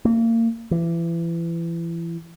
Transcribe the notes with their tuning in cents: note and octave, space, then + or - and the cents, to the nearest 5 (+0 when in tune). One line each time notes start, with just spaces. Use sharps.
A#3 -30
E3 +30